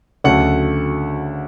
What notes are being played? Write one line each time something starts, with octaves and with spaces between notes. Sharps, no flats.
D2 C#3 F#3 A3 F#5